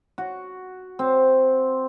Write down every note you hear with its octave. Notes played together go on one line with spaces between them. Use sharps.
F#4
C4